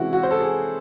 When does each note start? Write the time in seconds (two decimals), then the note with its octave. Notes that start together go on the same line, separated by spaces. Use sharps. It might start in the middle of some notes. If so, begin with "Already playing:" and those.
Already playing: C3 E3 G#3 C#4 E4 F#4
0.13 F#4
0.23 C5
0.31 A4
0.40 G#4